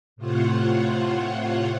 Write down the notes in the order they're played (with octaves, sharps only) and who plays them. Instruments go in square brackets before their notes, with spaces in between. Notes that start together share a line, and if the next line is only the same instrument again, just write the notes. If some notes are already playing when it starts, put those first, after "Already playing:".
[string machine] A2 C3 F4 C5 C#5 F#5